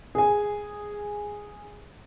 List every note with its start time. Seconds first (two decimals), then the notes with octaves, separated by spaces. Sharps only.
0.15 G#4 G#5